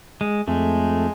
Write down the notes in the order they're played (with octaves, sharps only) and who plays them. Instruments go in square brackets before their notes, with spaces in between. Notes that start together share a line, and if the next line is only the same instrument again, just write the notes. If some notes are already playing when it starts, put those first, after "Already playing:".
[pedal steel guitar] G#3
[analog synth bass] F2 [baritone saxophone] G#3 [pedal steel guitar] A3